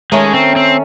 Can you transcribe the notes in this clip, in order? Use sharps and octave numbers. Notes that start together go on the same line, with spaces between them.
D#3 G#3 A3 C#4
C4
C4